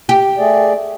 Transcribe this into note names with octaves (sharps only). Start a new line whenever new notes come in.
G4
A3 G#4 D5